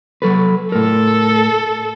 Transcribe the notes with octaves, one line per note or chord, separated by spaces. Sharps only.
F#3 A4 B4
A2 A4 A#4